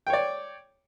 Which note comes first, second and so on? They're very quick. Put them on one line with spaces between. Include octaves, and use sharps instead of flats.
G5 C#5 D5